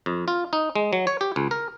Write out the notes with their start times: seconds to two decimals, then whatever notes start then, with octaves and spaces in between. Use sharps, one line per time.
0.06 F2
0.28 F4
0.53 D#4
0.76 G#3
0.93 F#3
1.07 C#5
1.21 G4
1.36 C#2
1.51 A#4